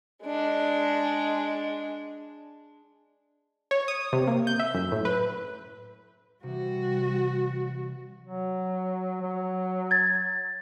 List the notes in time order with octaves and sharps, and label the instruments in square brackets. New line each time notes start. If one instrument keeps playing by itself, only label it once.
[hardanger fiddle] G#3 D4
[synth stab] C#5
D#6
C3
A#3
G6
E5
F#2
A2
B4
[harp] C3 E3 [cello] G3 F#4
[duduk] F#3
F#3
[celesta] G#6 A6